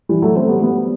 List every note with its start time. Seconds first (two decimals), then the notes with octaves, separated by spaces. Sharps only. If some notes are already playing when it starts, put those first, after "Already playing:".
0.09 E3 G3
0.22 F#3 A3
0.35 A3 C4
0.49 G3 B3
0.62 G3 B3